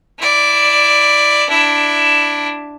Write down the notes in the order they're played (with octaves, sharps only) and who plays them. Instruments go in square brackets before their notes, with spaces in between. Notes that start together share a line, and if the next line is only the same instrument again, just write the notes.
[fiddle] E4 D5
D4 E4